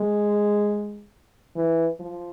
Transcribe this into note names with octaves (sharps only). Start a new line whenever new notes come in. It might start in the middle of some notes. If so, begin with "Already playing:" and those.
Already playing: G#3
E3
F3